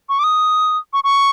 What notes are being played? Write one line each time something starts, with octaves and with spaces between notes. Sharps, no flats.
C#6
D6
D#6
C#6
C#6